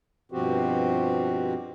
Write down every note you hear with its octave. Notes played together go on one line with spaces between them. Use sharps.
G2 B2 F3 C4 F#4 G4